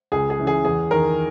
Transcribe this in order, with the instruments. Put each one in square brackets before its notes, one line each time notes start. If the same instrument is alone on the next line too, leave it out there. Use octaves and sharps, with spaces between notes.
[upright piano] C#2 G#4
G#4
C#3 E3
G#4
E2 G#4
D#3 A#4